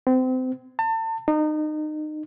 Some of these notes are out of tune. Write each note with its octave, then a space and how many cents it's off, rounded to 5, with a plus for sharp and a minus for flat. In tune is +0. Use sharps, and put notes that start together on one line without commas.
C4 -30
A5 +35
D#4 -30